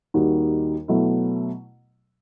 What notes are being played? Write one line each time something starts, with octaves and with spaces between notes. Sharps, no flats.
D#2 D#3 G3 D#4 F#4
B2 F#3 A3 E4